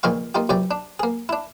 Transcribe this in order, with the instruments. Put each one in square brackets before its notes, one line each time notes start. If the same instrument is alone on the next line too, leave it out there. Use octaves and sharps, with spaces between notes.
[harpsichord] C#2 A#2 D#3 F3 F5 C#6
A#3 D#4 F4 G4
C#2 F#2 C3 D5 G5
D4
A#3 G#4
D4 E4